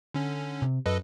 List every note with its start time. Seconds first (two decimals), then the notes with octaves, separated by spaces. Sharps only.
0.14 D3 C#4
0.62 C3
0.86 F#2 A4 B4 D#5